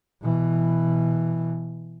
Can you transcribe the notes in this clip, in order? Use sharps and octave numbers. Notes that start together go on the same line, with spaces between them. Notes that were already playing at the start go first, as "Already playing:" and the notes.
B2 E3